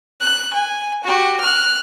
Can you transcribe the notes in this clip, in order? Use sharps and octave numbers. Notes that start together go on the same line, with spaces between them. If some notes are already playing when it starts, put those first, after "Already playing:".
F#6
G#5
F#4 G4
F6 F#6